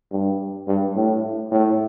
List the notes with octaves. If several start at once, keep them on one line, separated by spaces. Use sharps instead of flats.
G2
G2
A2
A2